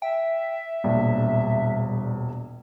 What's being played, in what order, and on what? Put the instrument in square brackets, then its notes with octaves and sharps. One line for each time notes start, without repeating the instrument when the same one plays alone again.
[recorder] E5 [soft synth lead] G5
[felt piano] E1 A#1 [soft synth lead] G3